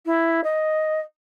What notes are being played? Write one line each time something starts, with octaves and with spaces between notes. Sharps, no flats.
E4
D#5